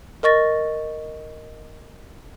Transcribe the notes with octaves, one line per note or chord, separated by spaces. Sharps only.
A#4 D#5 C#6 A6 A#6